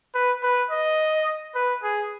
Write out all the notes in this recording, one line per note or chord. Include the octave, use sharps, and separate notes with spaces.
B4
B4
D#5
B4
G#4